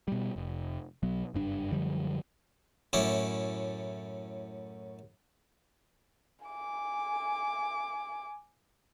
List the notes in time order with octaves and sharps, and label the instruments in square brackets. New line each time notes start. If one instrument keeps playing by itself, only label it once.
[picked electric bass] B2 G3
F1
B1 F#3 B3
F#1 G2 D4
F#2 D3 F3 G3
[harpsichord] F#2 A2 C#4 E4 D5
[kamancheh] G#5 D6